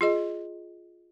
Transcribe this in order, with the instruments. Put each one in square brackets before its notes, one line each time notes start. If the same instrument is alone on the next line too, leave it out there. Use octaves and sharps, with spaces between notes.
[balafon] F4 G#4 D#5